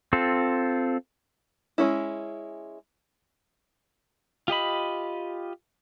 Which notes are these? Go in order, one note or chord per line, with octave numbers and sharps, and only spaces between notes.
C4 F4 A4
G#3 C#4 E4
F4 G4 D#5 B5